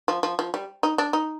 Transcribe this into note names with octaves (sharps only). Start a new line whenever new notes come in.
F3
F3
F3
G3
D#4
D4
D#4